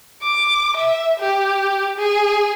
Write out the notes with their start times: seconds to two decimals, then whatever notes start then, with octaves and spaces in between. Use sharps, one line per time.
0.23 D6
0.76 E5
1.20 G4
1.98 G#4